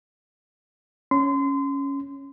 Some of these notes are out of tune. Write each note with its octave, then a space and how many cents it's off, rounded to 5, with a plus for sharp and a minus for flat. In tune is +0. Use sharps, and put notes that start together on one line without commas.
C#4 +0 C6 -30